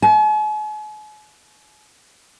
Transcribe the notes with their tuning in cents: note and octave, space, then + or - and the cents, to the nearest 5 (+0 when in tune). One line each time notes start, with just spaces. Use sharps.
G#5 +45